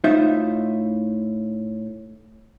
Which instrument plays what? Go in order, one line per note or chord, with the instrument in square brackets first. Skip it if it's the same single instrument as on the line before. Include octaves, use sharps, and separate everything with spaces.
[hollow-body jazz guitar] A2 D#4 F4 C5 E5